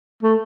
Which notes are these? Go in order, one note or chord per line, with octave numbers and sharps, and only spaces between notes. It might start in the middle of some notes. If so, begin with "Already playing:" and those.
A3